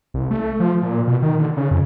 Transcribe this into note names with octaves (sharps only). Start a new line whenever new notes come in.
C2
A3
F3
A#2
B2
D#3
D3
C#3
F2